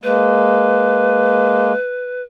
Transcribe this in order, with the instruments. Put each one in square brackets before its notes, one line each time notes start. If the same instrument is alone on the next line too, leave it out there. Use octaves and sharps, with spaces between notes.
[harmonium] G#3 A#3 [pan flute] B4